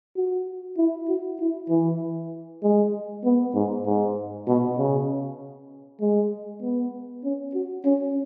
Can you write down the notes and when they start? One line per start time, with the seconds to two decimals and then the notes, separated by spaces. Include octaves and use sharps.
0.16 F#4
0.78 E4
1.08 F#4
1.40 E4
1.70 E3
2.63 G#3
3.25 B3
3.55 G#2
3.85 G#2
4.47 B2
4.78 C#3
6.01 G#3
6.62 B3
7.24 C#4
7.54 F#4
7.85 C#4